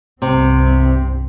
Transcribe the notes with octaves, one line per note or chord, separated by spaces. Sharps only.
C2 G2 C3 C4